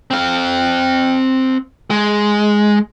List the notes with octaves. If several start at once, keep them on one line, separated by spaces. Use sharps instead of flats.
C4 F5
G#3